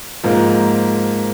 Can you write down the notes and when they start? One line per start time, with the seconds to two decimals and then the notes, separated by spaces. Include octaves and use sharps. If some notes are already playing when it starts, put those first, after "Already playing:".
0.24 G#2 F3 A#3